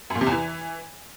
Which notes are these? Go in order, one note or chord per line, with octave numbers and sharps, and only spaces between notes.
F#2
A#2
C3
E2
E3